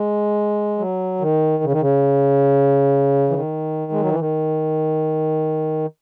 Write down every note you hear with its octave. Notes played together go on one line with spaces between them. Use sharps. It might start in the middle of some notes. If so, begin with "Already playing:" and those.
Already playing: G#3
F#3
D#3
C#3
D#3
C#3
E3
D#3
G#3
F#3
E3
D#3